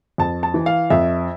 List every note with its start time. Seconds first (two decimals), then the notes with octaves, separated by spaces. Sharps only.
0.18 F2 A5
0.43 A5
0.54 E3
0.66 F5
0.90 F2 E5